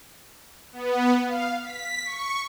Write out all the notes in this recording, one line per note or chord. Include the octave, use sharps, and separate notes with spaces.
B3
F5
B6
C#6